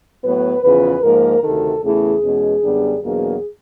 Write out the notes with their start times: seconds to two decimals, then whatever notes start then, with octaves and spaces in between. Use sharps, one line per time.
0.23 A2 F#3 B3 B4
0.63 E2 C#3 F3 B4
1.03 G#2 F3 A#3 A#4
1.43 D2 C3 D#3 A4
1.82 E2 C#3 E3 A3 G#4
2.22 E2 B2 G#3 C#4
2.63 F#2 D3 G3 B3 D4
3.03 E2 B2 F#3 A#3 D4 G#4